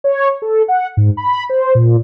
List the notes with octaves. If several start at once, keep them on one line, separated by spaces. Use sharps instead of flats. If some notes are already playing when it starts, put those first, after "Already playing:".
C#5
A4
F#5
G#2
B5
C5
A#2